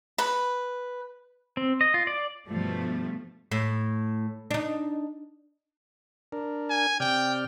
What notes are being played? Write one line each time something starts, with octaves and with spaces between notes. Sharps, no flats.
B4 B5
C4
D#5
F4
D5
G2 B2 F3 G3 A3
A2
D4 D#4
D4 A#4
G#5
C3 D5 G5 F6